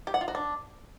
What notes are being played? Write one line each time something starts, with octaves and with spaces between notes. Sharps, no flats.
G4
F#5
F4
F#4
D4